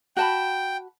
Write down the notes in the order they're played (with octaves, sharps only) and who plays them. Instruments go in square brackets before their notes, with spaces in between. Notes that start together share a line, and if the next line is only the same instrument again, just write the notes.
[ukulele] F#4 A5 B5 [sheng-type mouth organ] G5